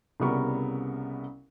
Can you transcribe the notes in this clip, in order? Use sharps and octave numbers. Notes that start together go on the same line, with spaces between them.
C2 C#3 G3 B3 A#4 C#6